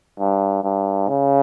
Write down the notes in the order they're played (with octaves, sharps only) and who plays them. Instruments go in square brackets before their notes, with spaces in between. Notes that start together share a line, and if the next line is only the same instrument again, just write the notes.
[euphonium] G2
G2
C#3